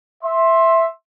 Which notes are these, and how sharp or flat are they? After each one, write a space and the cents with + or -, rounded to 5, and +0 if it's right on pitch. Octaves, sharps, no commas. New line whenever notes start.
E5 +0 C6 +15